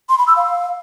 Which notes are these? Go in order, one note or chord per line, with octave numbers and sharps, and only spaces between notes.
C6
B5
E6
F5